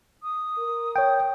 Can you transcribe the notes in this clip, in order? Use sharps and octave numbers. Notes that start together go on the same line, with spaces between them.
D#6
A#4
C#5 G5